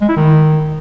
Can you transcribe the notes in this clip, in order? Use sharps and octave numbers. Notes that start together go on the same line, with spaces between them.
G#3
E4
D#3